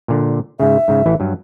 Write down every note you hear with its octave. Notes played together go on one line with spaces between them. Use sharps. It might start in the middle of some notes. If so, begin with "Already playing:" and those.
A#2 D3
G#2 C#3 E5
G#2 C#3
A1 E3 E4
G2 F#3